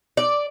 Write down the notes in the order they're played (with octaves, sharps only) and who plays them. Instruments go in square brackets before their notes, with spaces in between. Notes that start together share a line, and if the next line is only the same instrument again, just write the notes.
[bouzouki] D5